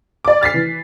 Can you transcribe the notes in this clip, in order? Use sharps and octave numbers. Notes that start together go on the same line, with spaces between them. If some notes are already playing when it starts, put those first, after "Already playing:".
D5 D6
F6 A6 B6 C7
E3